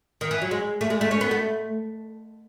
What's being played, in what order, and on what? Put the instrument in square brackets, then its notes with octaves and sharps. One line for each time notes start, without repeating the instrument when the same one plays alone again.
[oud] D#3
E3
F#3
G#3
A3
G#3
A3
C#4
B3
A3